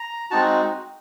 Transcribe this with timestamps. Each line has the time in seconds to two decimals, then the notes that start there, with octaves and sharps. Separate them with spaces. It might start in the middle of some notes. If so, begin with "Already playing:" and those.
Already playing: A#5
0.31 G#3 C4 D#4 F#4 A5